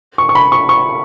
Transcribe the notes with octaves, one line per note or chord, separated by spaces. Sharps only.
C#6
C#6
B5
C#6
C#6